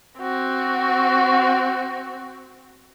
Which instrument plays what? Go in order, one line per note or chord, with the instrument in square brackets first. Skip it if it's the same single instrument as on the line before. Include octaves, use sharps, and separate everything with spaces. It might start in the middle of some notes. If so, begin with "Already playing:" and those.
[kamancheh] C4 F#4